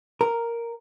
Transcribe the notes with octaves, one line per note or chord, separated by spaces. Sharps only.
A#4